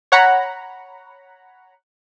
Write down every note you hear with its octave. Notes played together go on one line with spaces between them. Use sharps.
C#5 F#5 A#5 B5